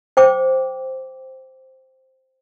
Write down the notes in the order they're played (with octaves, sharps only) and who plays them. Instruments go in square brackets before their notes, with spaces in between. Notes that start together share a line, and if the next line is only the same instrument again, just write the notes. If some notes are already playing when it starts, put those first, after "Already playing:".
[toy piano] C5 G5 D6